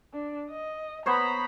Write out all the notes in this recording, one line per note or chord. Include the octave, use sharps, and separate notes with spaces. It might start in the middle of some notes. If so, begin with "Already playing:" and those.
D4
D#5
B3 C5 C#5 A#5 B5